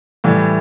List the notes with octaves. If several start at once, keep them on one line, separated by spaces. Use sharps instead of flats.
A2 E3 G3